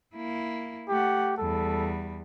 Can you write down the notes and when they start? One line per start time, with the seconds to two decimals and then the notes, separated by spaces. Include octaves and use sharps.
0.16 A#3 E4
0.89 A3 G4 F#5
1.38 E2 G3 A4